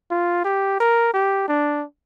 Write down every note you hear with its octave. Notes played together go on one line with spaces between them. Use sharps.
F4
G4
A#4
G4
D4